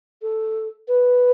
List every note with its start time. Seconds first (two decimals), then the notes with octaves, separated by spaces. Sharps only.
0.22 A4
0.88 B4